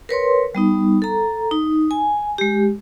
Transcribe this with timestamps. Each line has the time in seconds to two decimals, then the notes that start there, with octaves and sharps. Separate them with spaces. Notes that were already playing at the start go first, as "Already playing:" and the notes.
0.09 A#4 B4 C#5 C6
0.55 G3 B3 D#4
1.02 A4 A#5
1.51 D#4
1.91 G#5
2.38 G#3 G4